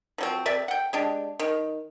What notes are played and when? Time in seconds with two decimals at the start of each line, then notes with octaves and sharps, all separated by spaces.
0.18 F3 F#3 C4
0.46 C3 D5 E5
0.68 F#5 G5
0.93 G#3 D4 G4
1.39 D#3